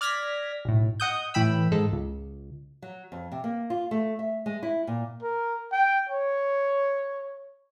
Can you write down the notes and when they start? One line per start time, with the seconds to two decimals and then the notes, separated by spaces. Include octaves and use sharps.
0.01 D5 F6 G#6 A#6 B6
0.65 B1 A2
1.00 D#5 F#5 D#6 G6
1.34 A2 E3 G5 B5 E6
1.72 G#2 G#3 A4
1.92 C#2
2.82 F#3
3.12 F2
3.32 C3
3.44 A#3
3.70 F4
3.91 A3
4.19 E5
4.46 G#3
4.63 E4
4.87 A#2
5.22 A#4
5.72 G5
6.10 C#5